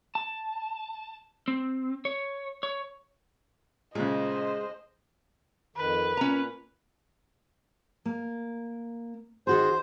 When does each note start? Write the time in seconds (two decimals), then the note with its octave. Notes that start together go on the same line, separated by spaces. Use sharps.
0.15 A5
1.48 C4
2.05 C#5
2.63 C#5
3.95 A#2 C#3 G#3 C5 D#5
5.76 F2 D#3 B4
6.17 A#2 C#4 A#5
8.05 A#3
9.47 D#3 F#4 G#4 C5